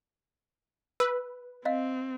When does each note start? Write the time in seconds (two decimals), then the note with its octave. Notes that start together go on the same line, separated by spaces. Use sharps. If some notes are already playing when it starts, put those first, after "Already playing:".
1.00 B4 E6
1.65 C4 D#5 F5